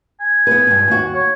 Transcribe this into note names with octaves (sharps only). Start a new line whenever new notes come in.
G#5
B3 B4
G2 B2
D#2 F#4
C#5